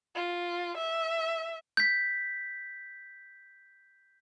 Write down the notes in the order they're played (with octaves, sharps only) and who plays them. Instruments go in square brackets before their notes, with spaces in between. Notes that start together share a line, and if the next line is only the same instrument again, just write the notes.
[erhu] F4
E5
[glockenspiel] G6 B6